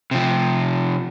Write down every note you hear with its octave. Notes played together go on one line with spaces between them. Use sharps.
C3 F3